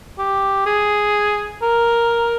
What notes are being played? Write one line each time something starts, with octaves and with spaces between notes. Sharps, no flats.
G4
G#4
A#4